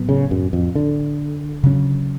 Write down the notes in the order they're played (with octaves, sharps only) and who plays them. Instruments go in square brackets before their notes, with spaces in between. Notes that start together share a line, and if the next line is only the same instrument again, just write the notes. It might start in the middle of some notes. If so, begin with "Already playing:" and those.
Already playing: [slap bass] A2 F#3 B3
[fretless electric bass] C#3
F#2
F2
D3
[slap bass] C#3 F#3 C#4